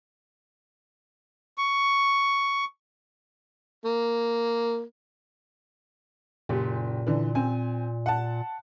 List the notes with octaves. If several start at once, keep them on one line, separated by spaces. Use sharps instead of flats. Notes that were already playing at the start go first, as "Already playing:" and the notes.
C#6
A#3
F#1 A#2 G4
D3 E3
C4 G#5
F#5 A5